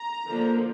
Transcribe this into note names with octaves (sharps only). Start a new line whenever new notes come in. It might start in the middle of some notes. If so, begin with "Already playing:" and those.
Already playing: A#5
D3 F3 A#3 D4